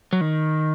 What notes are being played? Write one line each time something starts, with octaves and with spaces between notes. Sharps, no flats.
F#3
D#3